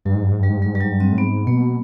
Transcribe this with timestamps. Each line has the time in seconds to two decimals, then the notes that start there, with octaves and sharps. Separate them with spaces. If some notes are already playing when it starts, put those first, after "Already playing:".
0.05 G2 F#3
0.15 G#2
0.23 G2
0.31 G#2
0.40 G2 G3
0.49 G#2
0.57 G2
0.62 G#2 G3
0.74 G2 G3
0.81 G#2 F#3
0.91 G2
1.00 C4
1.12 A2
1.18 G#2 B3
1.47 B2 A#3